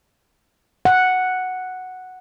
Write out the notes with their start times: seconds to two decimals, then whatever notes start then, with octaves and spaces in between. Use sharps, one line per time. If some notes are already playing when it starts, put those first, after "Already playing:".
0.85 F#5